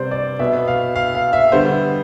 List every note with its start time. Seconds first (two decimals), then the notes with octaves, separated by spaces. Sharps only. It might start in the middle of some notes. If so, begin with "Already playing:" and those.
Already playing: C3 G3 B3 C5 D5
0.11 D5
0.39 B2 B3 E5
0.68 F5
0.96 F5
1.15 F5
1.33 E5
1.52 D3 G3 B3 C5